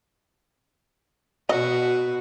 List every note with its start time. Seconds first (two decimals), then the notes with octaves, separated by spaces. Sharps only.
1.49 B2 F#4 D#5